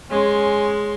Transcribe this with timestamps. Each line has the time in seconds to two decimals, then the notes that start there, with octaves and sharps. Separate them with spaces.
0.10 G#3 C#4 C6